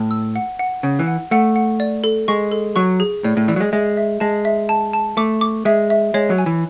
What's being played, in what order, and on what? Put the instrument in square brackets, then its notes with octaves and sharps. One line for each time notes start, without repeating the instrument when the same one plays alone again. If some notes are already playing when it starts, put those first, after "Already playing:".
Already playing: [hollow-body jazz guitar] A2
[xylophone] E6
F#5
F#5
[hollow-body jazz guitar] C#3 [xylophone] F#5
[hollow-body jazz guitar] E3
[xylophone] F#5
[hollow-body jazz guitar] A3 [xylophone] F#5
[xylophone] F#5
D5
A4
[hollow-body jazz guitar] G#3 [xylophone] C#6
[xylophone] A4
[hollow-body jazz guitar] F#3 [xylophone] C#6
[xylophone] G#4
[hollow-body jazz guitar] A2 [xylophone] D5
[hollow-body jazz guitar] A2
[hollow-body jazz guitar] E3 [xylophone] D5
[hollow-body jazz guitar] F#3
G#3
[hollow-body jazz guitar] G#3 [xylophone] E5
[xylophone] E5
[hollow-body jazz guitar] G#3 [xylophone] A5
[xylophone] E5
A5
A5
[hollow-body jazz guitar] A3 [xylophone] D6
[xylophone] D6
[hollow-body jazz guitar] G#3 [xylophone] E5
[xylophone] E5
[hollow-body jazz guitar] G#3 [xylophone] C#5
[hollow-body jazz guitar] F#3
[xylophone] G#5
[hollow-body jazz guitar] E3